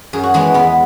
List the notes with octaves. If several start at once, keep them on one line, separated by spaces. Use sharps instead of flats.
F#2 G#4
F#4
E3 G#3 B3 G#4
E2 B3